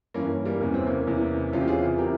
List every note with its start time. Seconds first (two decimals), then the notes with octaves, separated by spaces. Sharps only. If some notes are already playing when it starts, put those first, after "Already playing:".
0.14 G2 E3 A#3 C#4
0.45 G3 A#3
0.61 E2 C3 E3 C#4
0.74 C4
0.87 A#3 C#4
1.07 E2 C3 E3
1.53 E2 C3 E3 C#4 F4
1.61 G4
1.68 F4 G#4
1.98 C3 E3 G4 A#4